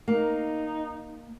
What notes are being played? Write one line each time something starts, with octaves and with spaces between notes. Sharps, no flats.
A#3 D#4